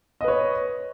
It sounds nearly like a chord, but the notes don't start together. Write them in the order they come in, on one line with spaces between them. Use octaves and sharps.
D#5 B4 C#5